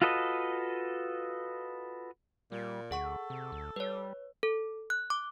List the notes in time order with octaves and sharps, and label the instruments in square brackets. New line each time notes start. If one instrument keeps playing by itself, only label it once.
[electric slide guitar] F4 F#4 A4 B4 D#5
[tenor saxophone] A#2 [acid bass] G3
[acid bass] D2 [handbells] G#4 F#5 C#6
[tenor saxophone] A4
[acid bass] C3
D2
[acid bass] G3 [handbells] B4 C#5
[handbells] A4
F#6
D6